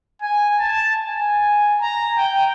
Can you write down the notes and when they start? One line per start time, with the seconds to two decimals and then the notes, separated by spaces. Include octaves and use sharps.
0.22 G#5
0.59 A5
1.06 G#5
1.81 A#5
2.17 G5